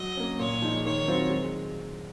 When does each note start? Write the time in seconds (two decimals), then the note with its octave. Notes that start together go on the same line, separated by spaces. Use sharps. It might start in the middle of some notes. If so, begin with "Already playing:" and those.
Already playing: F#3 D#5
0.17 A#3 C#4
0.39 A#2 C#5
0.62 F3 G#3 D#4
0.85 D#3 C#5
1.07 F#3 C4 F4 C5
1.30 G#3